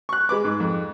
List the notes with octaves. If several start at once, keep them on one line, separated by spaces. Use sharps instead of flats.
C#6 F#6
G#3 B4 D6
G#2
F2